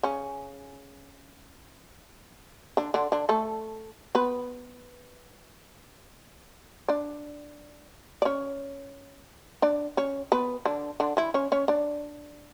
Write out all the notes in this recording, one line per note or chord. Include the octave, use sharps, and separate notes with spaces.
C#3 C#4
D3 D4
D3 D4
D3 D4
A3 A4
B3 B4
D4 D5
D5
C#4 C#5
D4 D5
C#4 C#5
B3 B4
D3 D4
D3 D4
E3 E4
C#4 C#5
C#4 C#5
D4 D5